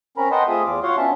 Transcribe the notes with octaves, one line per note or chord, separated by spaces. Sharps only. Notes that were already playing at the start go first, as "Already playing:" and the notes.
C4 C#4 A#4 A#5 B5
B4 D#5 F#5 G5 A5 C6
A3 C4 F4 G#4 E5 D#6
E2 F4 D6
F4 F#4 C#5 F5 F#5 C6
B3 C#4 D4 E5 A5